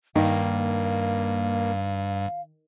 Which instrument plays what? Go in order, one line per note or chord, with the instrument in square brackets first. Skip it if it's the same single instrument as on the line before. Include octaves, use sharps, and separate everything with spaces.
[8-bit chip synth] G2 [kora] D#3 [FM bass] A#3 [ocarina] F5